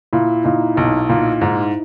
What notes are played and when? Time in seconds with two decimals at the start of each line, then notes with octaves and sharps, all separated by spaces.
0.13 A#2 E4
0.44 A#2 D#4
0.77 B1 D#4
1.09 A#2
1.41 G#2